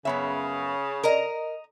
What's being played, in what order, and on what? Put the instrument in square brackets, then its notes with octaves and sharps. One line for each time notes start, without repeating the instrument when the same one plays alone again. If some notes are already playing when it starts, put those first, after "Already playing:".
[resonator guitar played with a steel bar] F#2 B3 E5 [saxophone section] C#3
[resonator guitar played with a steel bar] A#4 [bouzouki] D#5 A#5